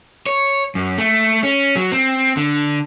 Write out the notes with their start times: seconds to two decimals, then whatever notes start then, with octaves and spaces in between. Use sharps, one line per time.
0.26 C#5
0.75 F#2
0.98 A3
1.43 C#4
1.76 F#3
1.92 C4
2.37 D3